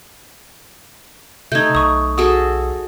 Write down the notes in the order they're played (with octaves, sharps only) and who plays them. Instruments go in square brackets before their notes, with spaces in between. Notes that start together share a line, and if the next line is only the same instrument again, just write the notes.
[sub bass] C3 [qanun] A3 D#4 [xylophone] G6 G#6
[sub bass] B1 [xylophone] C#6 D#6
[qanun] F#4 G#4 A4 [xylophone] D#6